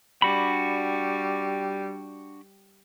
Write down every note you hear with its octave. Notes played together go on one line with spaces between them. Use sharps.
G3 D4 F#4 B5